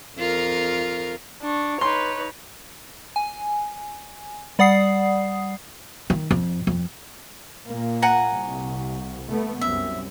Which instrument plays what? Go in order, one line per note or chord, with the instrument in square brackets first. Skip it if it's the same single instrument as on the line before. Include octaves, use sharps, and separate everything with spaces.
[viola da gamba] F2 F4 A#4
[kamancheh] D4 C#6
[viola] D#4 B4 [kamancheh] C#5 [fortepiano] C6
[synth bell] G#5
G3 D5 F#5 D#6 C7
[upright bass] D#3
F2
F2
[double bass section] A#2 A#3
[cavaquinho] F#5 G#5 A#5
[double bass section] C2
A3 B3
[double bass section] C2 F#2 [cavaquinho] E5